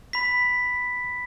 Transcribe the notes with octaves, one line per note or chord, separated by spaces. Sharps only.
B5 B6